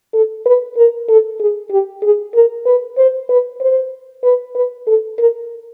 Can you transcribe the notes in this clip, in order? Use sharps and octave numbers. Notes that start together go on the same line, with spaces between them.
A4
B4
A#4
A4
G#4
G4
G#4
A#4
B4
C5
B4
C5
B4
B4
A4
A#4